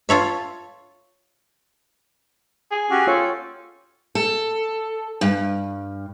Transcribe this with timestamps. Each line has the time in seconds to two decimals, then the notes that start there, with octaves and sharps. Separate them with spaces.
0.09 F4 A4 C#5 E5
2.71 G#4
2.91 C#4 F#4 G4
3.07 F4 A4 C#5 G5
4.15 A4
5.21 G2